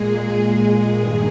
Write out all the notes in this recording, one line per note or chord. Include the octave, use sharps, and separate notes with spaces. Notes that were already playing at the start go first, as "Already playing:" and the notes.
Already playing: A#2 G#3 G#4
G#4
G2 D#3 G#3